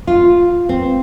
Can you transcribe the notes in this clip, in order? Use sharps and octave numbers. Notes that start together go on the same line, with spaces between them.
F4
C4